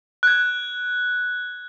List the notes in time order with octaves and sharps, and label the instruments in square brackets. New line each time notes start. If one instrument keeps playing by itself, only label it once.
[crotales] F#6 G#6